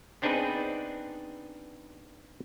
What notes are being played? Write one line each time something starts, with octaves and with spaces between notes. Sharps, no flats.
B3 C4 D4 D#4 G#4 B4